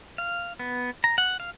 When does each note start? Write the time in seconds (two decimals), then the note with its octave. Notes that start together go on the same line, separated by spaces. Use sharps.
0.18 F5
0.59 B3
1.04 A#5
1.18 F#5
1.40 F5